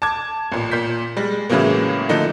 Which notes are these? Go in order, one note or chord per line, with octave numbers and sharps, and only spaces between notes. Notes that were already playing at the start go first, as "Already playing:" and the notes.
A5 D6 G#6
A1 A#2
A#2 G6 B6
G3 G#3
A2 C#3 E3 F#3 G#3 A#3
D3 F3 A3 A#3 D#4 E4